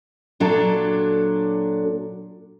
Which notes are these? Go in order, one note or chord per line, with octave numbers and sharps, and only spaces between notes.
A#2 F#3 D4 A4